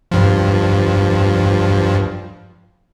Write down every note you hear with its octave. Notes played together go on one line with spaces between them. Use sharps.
G2 F3